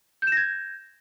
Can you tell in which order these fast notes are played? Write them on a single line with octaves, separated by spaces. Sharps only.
G6 E7 A#6 G#6